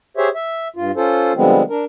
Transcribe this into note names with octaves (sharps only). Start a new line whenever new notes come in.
G4 G#4 C5 C#5 E5
E5
G2 F4
C#4 F4 A4 C5
D3 F3 G3 G#3 B3 C4
D4 A#4